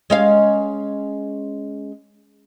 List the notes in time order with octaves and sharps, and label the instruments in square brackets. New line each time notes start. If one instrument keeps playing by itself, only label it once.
[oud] G#3 C#4 F5